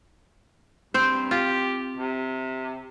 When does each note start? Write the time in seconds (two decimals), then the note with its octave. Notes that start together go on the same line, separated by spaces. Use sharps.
0.94 G2 C4 C5
1.31 F4 G4
1.97 C3